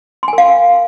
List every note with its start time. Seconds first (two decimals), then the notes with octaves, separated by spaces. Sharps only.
0.23 C6
0.28 G#5
0.33 A#4
0.38 F5